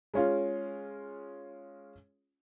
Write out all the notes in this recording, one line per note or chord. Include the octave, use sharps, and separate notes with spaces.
G#3 C#4 F4